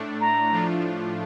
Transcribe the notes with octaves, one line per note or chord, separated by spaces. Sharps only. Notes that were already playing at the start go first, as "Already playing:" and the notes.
Already playing: A2 A3 D4
A#5
A2 F3 A3 D4 F4